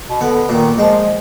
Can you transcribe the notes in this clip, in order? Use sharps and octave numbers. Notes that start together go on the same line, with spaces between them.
B2
D3 B3
A#2 D#3
F3 G#3